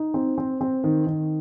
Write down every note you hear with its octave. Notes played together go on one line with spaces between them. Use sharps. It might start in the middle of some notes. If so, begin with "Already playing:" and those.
Already playing: D#4
C4
C4
C4
D#3
D#3